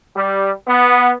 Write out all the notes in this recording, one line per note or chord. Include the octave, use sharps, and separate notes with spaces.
G3
B3